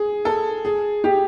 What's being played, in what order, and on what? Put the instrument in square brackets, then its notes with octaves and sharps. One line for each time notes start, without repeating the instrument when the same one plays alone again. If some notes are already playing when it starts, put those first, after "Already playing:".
Already playing: [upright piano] G#4
A4
G#4
G4